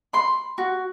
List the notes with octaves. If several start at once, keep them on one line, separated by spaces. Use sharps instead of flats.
B5 C6
F#4